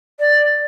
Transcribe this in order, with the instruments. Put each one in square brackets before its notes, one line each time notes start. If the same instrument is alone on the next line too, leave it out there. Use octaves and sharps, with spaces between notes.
[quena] D5